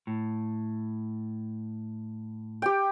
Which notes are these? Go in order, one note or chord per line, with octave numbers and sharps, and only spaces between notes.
A2
G4 G5